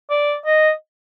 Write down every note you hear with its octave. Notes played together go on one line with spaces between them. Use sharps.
D5
D#5